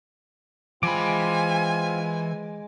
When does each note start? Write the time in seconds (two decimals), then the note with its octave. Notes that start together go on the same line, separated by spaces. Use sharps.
0.83 E3 G#3 C4 F4 G#5 B5 D6